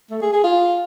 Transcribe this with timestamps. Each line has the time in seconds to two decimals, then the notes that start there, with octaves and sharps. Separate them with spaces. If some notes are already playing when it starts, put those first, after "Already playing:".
0.10 A3
0.22 G#4
0.33 G#4
0.44 F4